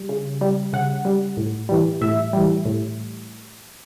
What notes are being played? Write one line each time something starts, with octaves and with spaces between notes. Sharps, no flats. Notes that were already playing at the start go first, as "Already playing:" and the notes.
Already playing: G3
C#3
G3
C#3 F#5
G3
A2
E3 G3
A2 E5
E3 G3
A2